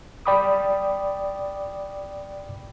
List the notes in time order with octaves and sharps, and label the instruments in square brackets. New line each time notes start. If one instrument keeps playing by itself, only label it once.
[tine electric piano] D5 G5 B5 D6 D#6